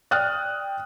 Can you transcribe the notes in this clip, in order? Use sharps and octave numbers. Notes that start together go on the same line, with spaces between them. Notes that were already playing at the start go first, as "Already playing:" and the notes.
D5 G5 D#6 F6 F#6 A6